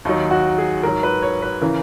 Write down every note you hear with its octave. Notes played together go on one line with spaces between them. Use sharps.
D#2 D#3 F#3 D#4
F#4
G#4
G#2 F#3 A#4
B4
C#5
B4
C#3 E3 A#4